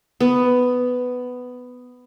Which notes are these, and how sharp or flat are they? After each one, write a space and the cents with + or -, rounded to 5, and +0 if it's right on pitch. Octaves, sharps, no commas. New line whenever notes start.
B3 +10